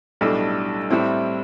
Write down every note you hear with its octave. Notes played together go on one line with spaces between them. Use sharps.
B1 A2 G3 D4 A4
A2 G3 C4 E4